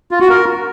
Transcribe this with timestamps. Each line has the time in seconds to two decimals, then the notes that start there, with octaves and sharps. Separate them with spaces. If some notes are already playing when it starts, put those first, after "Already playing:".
0.11 F4
0.20 F#4
0.30 A#4